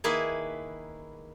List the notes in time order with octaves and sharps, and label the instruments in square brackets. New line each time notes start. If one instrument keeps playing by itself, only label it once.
[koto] D#3 A#3 E4 G#4 B4